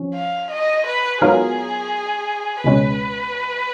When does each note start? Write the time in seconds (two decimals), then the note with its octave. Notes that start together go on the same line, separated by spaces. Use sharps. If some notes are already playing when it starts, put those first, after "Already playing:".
Already playing: F3 C#4
0.15 F5
0.51 D#5
0.87 B4
1.21 G#2 F#3 B3 F4 G#4 A#4
2.64 C#2 B2 G#3 C#4 B4